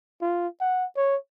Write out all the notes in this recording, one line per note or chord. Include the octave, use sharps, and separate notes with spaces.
F4
F#5
C#5